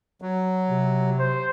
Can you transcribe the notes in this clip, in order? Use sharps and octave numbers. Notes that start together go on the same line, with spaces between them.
F#3
C3
C5